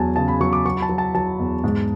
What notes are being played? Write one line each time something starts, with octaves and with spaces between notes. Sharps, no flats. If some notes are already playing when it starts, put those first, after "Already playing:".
Already playing: E2 F#3 G#5 A5
C#3 A5
B5
F#3 C#6
D6
F#3 C#6
B5
A5
F#3
A5
F#3 A5
E2
G#2